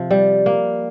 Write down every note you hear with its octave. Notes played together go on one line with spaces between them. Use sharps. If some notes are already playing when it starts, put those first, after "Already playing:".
Already playing: C3 F3
G3
A#3